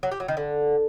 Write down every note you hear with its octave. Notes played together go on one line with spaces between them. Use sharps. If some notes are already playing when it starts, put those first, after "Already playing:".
F#3
G4
F#3
D#3
D3